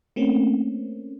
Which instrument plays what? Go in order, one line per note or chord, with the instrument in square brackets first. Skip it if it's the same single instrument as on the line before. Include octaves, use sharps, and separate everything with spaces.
[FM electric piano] A3 A#3 C4 C#4